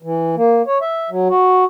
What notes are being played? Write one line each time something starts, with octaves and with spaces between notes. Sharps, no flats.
E3
A#3
C#5
E5
F#3
F#4